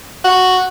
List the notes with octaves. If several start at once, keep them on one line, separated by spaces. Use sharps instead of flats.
F#4